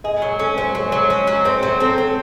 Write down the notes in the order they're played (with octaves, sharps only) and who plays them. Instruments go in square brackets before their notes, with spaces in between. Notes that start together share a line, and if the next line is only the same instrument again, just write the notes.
[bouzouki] G#4 [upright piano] D#5
[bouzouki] F#3 [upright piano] C#5
[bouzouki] C#4 [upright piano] A4
[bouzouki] F#3 [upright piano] C5
[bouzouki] F#3 [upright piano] C#5
[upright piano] C5
[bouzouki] F#3
[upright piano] C#5
[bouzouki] C#4
F#3
[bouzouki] C4 [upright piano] C5
[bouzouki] F#3 [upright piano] C5
[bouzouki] C4 [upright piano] A4
[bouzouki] C4 [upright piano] A4